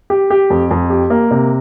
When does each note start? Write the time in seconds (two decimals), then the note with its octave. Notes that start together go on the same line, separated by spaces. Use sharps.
0.10 G4
0.30 G4
0.50 F2
0.71 F2
0.90 G4
1.10 A#3
1.31 C3